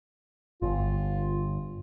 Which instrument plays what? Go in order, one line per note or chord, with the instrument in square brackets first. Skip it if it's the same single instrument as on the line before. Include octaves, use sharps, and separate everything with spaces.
[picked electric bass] G1 [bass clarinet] F4